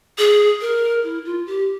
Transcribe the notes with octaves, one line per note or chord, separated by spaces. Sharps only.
G#4
A#4
E4
F4
G4